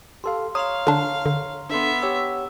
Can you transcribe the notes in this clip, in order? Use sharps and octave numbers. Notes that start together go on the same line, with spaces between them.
G4 A4 F5 C6
C#5 F5 A#5 C6 D#6 F7
D3 D4
D3
B3 D4 A4 E5 C6
G4 C#5 F#5 E6